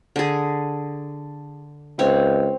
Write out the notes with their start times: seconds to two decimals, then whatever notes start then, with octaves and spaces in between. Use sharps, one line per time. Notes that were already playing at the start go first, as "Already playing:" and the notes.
0.16 D3 G#4
1.99 C#2 C4 C#5